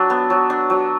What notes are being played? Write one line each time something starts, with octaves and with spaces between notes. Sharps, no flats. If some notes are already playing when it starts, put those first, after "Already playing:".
Already playing: F#3 D4
B3
F#3
D4
F#3